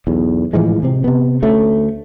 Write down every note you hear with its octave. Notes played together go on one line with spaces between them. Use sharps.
B1 E2
A2 E3 F3 G#3
C3 C4
C3 B3
D2 A3 C#4